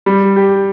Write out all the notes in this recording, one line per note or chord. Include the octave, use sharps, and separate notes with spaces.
G3
G4